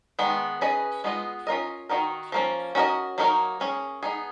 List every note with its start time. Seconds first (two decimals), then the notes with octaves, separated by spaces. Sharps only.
0.19 D#3 G#3 B3
0.61 C#4 G#4 B4 D#5
1.04 G#3 B3 F4 A#4 D#5
1.47 C#4 F4 A#4 D#5
1.89 D#3 G#3 D#4 F#4 A#4
2.32 F3 A#3 C#4
2.75 C#4 F#4 A#4 D#5
3.18 F#3 A#3 D#4 A#4 C#5
3.60 A#3 C#4 G#4
4.03 B3 D#4 G#4